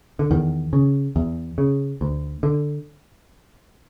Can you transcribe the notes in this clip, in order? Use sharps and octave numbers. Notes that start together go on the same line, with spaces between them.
D3
E2 D#3
C#3
E2
C#3
D2
D3